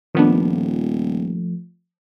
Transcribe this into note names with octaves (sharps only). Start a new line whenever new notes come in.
D#1 D#3 F3 A3 B3 D4